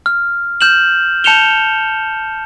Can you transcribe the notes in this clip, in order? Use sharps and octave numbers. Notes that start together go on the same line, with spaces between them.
F6
F6 G6 E7 F#7
A5 G6 C#7 E7 F7 G7